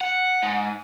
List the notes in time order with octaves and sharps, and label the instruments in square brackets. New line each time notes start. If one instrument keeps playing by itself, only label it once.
[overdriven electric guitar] F#5
G#2